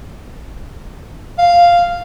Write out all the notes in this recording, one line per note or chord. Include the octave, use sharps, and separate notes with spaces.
F5